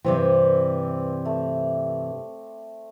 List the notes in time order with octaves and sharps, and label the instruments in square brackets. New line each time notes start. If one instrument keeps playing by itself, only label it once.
[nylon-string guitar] G2 C3 E3 [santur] C4 D5
[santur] A3